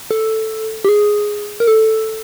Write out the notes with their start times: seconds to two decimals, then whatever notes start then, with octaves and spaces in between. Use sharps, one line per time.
0.11 A4
0.85 G4
0.89 G#4
1.60 A#4
1.67 A4